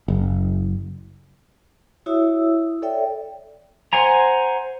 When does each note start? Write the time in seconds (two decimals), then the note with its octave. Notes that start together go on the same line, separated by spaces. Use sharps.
0.08 F#1
2.06 E4 F#4 C#5 E5 D#6 E6
2.82 A4 C#5 D5 E5 G5
3.93 C5 F#5 G#5 A#5